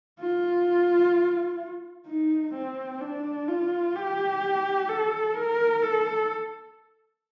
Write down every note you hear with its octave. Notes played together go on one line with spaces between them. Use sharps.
F4
D#4
C4
D4
F4
G4
A4
A#4
A4